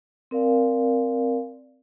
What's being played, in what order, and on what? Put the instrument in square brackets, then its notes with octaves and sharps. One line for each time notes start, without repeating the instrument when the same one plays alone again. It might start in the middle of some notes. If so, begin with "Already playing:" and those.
[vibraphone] C4 A#4 D5 F5 G#5